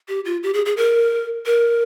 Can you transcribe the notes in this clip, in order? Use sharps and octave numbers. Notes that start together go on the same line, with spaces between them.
G4
F4
G4
G#4
G#4
A#4
A#4